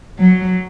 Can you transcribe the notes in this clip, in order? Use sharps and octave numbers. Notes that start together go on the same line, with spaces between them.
F#3